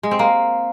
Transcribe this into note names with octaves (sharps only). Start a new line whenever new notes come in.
G#3
C4
A#3